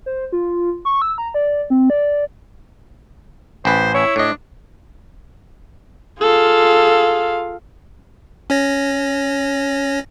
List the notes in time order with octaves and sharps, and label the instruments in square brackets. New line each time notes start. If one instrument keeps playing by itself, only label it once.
[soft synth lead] C5
F4
C#6
E6
A#5
D5
C4
D5
[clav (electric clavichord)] A1 B4 [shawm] C5
[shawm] E4 [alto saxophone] C#5
[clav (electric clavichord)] A2 D#5 [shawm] D4
[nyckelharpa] F4 F5 [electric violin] G#4 A4
[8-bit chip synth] C#4 C#5 A#6